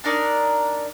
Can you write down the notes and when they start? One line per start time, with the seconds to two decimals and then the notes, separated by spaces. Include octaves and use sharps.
0.04 D4 D#4 A#4 D5